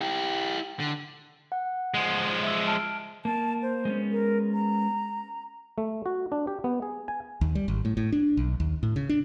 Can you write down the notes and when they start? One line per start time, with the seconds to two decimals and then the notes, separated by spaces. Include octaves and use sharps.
0.01 E4 G4
0.80 D3
1.52 F#5
1.94 F3 G#3
2.43 E5 E6
2.67 A5 F6 D7
3.25 A#3 A5
3.62 C5
3.85 G#3 B3 C#4
4.11 A#4
4.53 A#5
5.78 A3
6.06 F#4
6.32 D4
6.47 G4
6.64 B3
6.82 G#4
7.08 G#5
7.41 D#2
7.55 G3
7.68 G#1
7.85 A2
7.97 A2
8.12 D4
8.37 B1
8.60 D#2
8.83 A2
8.96 C#3
9.09 D4